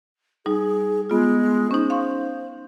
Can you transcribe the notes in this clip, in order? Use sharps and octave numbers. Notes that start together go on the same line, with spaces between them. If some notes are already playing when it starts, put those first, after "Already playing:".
G3 D#4 G#4
G#3 B3 F4
C#4 D#4 C5
F5 C6 C#6